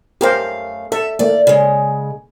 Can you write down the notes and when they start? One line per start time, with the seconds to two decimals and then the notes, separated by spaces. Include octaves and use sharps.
0.21 F#2 A3 G4 A#4 C5 F5
0.92 A4 E5
1.19 A3 A#3 D5
1.47 C#3 G#3